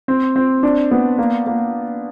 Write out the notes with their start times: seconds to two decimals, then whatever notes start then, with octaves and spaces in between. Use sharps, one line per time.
0.08 C4
0.36 C4
0.63 D4
0.91 B3
1.18 A#3
1.47 A#3